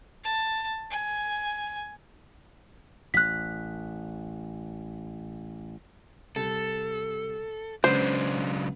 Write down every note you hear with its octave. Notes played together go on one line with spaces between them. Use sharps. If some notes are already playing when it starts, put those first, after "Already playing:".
A5
G#5
A1 F#6 B6
C2 A4
C#2 C#3 F#3 B3 D4 C5